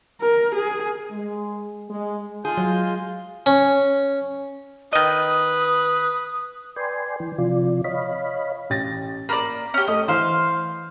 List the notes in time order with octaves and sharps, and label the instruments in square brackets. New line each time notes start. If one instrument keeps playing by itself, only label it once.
[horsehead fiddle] A#4
G#4
[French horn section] G#3
G#3
[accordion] G#3 F4 G6 [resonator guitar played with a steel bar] G#4
[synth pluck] F#3
[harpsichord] C#4
[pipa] D#3 D#5 [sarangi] B4 [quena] D#6
[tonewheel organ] B4 D5 G5 G#5 C6
E3
C3 F3 F4 D5
C#5 D#5 F5 B5
[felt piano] A1 A6 A#6
[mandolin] A#3 D5 [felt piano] B5
[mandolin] C#4 G4
[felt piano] A3 [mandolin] D#5
[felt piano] E3 F6 [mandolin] C5 F5